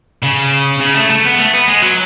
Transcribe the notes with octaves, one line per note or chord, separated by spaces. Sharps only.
C#3
C#3
A3
A3
B3
A3
B3
G#3
F#3